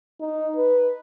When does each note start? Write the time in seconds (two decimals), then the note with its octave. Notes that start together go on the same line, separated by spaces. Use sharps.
0.20 D#4
0.57 B4